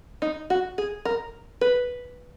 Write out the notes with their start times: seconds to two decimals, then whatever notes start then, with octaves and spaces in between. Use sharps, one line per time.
0.22 D#4
0.50 F#4
0.78 G#4
1.05 A#4
1.61 B4